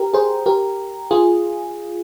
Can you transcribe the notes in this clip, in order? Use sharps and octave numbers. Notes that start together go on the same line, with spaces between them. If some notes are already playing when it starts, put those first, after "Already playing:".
Already playing: G4 A#4
G#4 C5
G4 A#4
F4 G#4